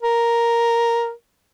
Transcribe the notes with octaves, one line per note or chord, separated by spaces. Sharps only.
A#4